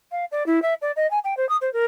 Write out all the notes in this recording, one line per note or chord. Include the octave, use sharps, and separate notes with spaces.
F5
D5
E4
E5
D5
D#5
G#5
G5
C5
D#6
C5
A#4